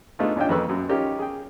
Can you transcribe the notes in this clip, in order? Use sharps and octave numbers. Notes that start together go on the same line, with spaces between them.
G#3 A3 B3 D4 D#4 F4
A1 C#4 D4 F4 D#5 G5
F2 G#3 A#3 B4 C#6 E6
F#2
C#4 D#4 F4 G4 A#4 D5
G#4 G5